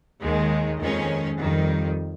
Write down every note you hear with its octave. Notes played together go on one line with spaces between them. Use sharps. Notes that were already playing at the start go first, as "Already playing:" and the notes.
D#2 D#3 G#3
F2 D#3 G#3 C#4
F2 D#3 G3